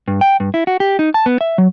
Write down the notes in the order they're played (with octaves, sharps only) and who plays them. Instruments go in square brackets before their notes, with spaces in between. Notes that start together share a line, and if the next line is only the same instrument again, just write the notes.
[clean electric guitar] G2
G5
G2
E4
F#4
G4
D#4
A5
B3
E5
F#3